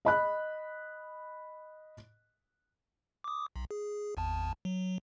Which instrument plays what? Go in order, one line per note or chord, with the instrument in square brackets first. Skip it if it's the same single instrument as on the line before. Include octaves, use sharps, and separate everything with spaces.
[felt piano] D#5 B5 F#6
[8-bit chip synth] D6 D#6
B1
G#4
G#1 E2 A5
F#3